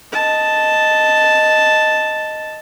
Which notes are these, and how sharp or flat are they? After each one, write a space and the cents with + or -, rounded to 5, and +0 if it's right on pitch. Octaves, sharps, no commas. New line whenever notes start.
D#5 +0 A5 +0